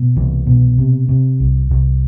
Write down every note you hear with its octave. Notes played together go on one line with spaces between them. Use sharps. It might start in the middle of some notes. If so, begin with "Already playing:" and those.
Already playing: B2
C2 E3
B2
C3
C3
C2
C2